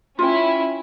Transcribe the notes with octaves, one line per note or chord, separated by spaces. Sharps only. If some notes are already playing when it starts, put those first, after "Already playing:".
C#4 E4 F4 G5